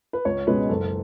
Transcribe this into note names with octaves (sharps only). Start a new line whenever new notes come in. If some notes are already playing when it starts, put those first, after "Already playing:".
B4
C#2 C#5
B2 G#3 C#4 B4
F#1 A4